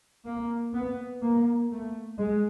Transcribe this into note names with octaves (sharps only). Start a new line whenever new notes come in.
A#3
B3
A#3
A3
G#3